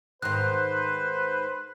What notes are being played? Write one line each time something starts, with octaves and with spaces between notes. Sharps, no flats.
G#2 D#3 B4 C5 F#6